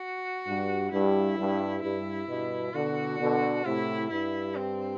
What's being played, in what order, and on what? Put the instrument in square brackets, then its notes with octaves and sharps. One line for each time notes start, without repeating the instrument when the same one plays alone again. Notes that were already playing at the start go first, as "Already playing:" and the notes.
Already playing: [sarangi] F#4
[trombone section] G2
[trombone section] G2 [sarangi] E4
[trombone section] G2
[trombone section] G2 [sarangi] E4
[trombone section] G2 B2
[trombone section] B2 D3 [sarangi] F#4
[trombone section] B2 D3
[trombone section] A2 C3 [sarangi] E4
[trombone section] G2 [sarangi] E4
[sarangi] C4